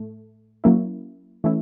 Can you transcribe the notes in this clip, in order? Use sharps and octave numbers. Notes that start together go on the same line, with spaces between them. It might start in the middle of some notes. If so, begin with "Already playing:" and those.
Already playing: A2 A3
F#3 A#3 C#4 E4
E3 A3 C#4 E4